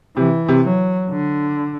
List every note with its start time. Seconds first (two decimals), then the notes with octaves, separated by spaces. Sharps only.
0.17 C3 E3
0.48 C3
0.64 F#3
1.11 D3